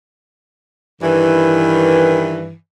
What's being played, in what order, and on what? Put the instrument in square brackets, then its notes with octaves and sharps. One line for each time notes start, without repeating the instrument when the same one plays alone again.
[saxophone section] G2 D#3 E3